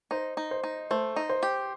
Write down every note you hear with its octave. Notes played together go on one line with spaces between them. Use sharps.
D#4 C5
D#4
C5
D#4
A3 C5
D#4
C5
G4